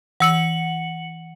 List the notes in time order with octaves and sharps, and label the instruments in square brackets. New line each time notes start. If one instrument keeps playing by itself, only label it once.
[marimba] E3 E6 [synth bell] F#5 C#7 F#7